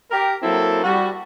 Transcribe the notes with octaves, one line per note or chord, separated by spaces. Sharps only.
G4 A#4
F#3 A#3 C4 E4 A4
G3 F#4